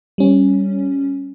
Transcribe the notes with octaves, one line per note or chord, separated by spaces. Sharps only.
G3 C#4